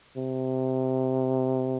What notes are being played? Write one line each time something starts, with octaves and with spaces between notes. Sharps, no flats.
C3